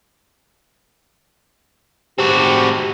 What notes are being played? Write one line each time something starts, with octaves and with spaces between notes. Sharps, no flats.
C4 F#4 G4